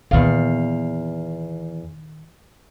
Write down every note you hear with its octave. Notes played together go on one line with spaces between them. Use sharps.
E2 A#2 D#3 F5